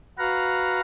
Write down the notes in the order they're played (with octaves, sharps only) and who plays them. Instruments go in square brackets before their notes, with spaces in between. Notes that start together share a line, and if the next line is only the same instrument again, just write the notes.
[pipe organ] F#4 B4 F5 F#5 A#5